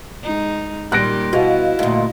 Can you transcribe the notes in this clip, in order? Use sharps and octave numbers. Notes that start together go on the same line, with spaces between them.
G#3 D#4
A#2 D#3 G3 G4 F#6 A#6 D7
B2 E4 F#4 D#5 F5
D2 A#2